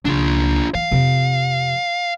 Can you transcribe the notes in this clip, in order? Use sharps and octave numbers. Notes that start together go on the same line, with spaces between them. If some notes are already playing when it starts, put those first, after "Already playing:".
C#2 D4 F4
E3 F5
F2 C3